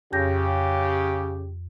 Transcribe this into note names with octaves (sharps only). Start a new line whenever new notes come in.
F2 C#3 G4 G6 A#6